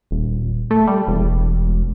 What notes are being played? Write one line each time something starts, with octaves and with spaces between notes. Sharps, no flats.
D#1
A3
G3
E1